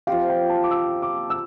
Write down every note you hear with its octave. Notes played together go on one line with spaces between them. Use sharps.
F3 C4 G4 F5
G5
A5
D6
E6
D6
E6